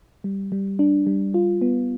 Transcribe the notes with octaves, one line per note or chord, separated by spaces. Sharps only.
G3
G3
D4
G3
F4
B3